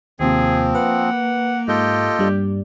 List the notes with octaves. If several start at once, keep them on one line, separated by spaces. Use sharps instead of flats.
D#2 C3 F3 A#3 C4 G#4
B4 F#5
G#2 F4 G4 A4 D#5 G6
G2 G3 D5